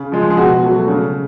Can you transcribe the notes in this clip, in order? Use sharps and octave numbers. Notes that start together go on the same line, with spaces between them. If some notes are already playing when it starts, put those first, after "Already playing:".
Already playing: C#3
F3 G#3
G#4
B2 F#4
F#3 A3
C#3